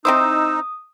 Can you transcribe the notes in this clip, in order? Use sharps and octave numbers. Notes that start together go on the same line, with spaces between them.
C4 D#4 E4 C5 D#6 E6